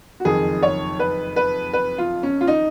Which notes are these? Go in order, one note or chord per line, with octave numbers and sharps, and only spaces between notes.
F#4
F#1 F2 D#3 G#4
C#5
B4
B4
B4
F4
C#4
F4
D#4